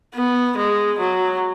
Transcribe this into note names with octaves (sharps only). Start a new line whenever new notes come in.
B3
G#3
F#3